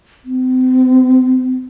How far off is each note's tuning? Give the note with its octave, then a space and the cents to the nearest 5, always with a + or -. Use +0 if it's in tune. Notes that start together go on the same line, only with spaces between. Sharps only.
C4 -35